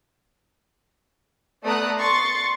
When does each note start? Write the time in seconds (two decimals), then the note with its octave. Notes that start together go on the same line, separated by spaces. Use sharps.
1.64 A3 B3 D5 A#5 D#6 F#6
1.98 C6 C#6 A6